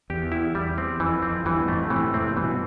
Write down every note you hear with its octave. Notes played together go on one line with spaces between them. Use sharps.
E2 G4
E4
E2 G3
C4
F2 E3
F2 C4
E2 G2 E3
F2 A2 A3
A2 C3 E3
F2 A2 C4
A2
G2 B2 E3